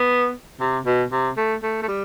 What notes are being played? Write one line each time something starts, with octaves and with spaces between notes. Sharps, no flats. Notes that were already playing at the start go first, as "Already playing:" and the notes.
Already playing: B3
C3
B2
C3
A3
A3
A3
G3